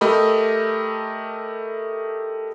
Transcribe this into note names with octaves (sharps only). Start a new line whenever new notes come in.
A3 G4 A#4 D#5 B5